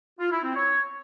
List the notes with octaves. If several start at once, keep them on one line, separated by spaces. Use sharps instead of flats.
F4
E4
C4
C#5